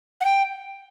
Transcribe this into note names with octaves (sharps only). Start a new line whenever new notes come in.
F#5
G5